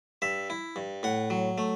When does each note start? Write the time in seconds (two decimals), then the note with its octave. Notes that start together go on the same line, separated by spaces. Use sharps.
0.22 G2 E5
0.50 E4
0.76 G2
1.03 A2 F#5
1.30 F#3
1.58 A3